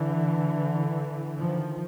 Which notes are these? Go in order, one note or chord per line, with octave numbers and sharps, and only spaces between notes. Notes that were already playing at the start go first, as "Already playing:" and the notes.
Already playing: D3 E3
D#3 F3